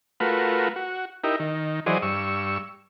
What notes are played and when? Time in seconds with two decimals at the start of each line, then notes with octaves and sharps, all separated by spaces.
0.20 A3 F4 F#4 A#4 B4
0.76 F#4
1.24 D#4 E4 G4 A#4
1.40 D#3
1.86 E3 F#3 G#4 C5 D5 D#5
2.02 G2 C#6 E6